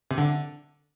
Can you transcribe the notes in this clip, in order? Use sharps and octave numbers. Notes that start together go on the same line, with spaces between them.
C3
D3